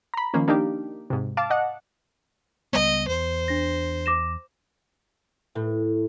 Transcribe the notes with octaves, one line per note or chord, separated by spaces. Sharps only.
A#5 B5
D#3 F3 A#3 C#4
A#3 D4 D#4 G4
G#2 C3
F5 A5 D6
D#5 F#5
C#2 G3 B3 D#5
E2 C5
D4 A#6
D6 A#6 E7
A2